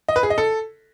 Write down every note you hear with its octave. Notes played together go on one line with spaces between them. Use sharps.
D#5
B4
G#4
D#5
A4